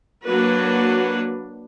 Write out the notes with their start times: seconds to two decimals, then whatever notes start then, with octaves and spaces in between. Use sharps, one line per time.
0.24 F#3 A#3 D4 F#4 B4